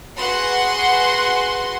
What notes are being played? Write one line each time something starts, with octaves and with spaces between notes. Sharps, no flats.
F#4 G#4 B4 F#5 C6